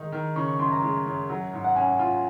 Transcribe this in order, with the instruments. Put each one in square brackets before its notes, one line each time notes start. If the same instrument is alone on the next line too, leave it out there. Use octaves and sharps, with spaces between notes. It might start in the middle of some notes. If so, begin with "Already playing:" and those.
Already playing: [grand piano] D#3 G#3 D#4
D#3
[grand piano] C#3 [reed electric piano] C#6
[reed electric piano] C#6
[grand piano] F#2 [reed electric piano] C6
[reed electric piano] A#5
[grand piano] G#3
F#2
F#3
G#2
[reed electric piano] F#5
[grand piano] C#4 [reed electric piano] G#5
[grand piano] F4